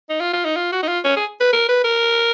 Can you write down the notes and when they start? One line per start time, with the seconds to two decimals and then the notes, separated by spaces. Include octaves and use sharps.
0.10 D#4
0.21 F4
0.33 F4
0.45 D#4
0.56 F4
0.73 F#4
0.83 D#4
0.88 F4
1.05 C#4
1.17 G#4
1.40 B4
1.53 A#4
1.68 B4
1.84 A#4